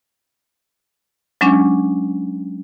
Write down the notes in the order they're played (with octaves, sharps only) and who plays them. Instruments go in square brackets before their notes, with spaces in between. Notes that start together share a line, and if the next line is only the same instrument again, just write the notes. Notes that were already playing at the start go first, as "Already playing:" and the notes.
[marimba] F#3 G#3 C#4 D4